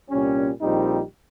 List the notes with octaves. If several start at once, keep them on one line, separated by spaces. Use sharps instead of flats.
C2 A#2 G3 C#4
A#1 A#2 G3 C4 D#4